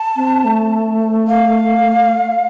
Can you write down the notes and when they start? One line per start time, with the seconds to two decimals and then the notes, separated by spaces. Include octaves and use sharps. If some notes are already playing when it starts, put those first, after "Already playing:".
Already playing: A5
0.16 C4
0.45 A3
1.28 F5